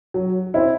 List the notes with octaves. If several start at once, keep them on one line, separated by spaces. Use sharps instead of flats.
F#3
C4 E4